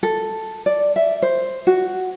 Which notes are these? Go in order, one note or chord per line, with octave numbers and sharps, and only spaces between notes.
A4
D5
E5
C5
F#4